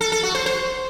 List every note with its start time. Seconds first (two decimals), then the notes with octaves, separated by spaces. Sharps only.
0.01 A4
0.12 A4
0.23 F#4
0.35 C5
0.46 C5